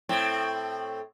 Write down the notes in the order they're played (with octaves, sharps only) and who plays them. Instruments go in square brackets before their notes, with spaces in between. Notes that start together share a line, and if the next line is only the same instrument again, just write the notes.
[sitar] A2 C4